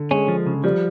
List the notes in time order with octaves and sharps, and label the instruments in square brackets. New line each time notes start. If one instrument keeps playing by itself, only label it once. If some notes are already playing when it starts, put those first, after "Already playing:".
Already playing: [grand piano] D3
[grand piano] G#3 [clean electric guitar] C#4
[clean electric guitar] F3
C#3
[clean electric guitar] F3 [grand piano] G3